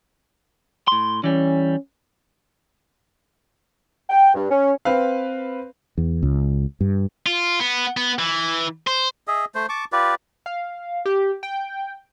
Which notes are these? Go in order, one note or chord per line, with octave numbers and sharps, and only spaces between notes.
A2 C6
E3 G3 C#4
G5
G2
C#4
C4 B4 F5
E2
C#2
G2
F4
B3
B3
E3
C5
G#4 D#5 E5
A3 C5
A5 C#6 D6
F4 G4 B4 D5
F5
G4
G5